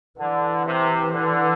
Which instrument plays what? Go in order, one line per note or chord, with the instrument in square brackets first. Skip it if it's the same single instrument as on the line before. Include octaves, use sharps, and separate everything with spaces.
[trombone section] D3 [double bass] E3
[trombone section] C3
D3